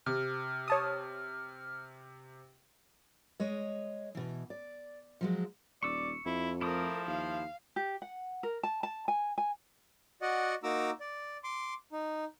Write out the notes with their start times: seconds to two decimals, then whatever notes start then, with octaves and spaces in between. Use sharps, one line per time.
0.06 C3 F6
0.68 C#5 A5 D#6
3.40 G#3 C#5 D#5
4.15 B2 E3
4.50 D5
5.21 F3 F#3 G#3
5.83 D#1 D5 C#6 E6
6.26 F2 E4
6.61 F3 A3 E4 A#4 D6 D#6
7.07 D#2 F5
7.76 G4
8.02 F#5
8.43 A#4
8.63 A5
8.83 A5
9.08 G#5
9.38 G#5
10.22 F#4 D5 D#5 F#5
10.64 A#3 D#4 F#4 A#5 D6 E6
11.01 D5
11.44 C6 D6
11.92 D#4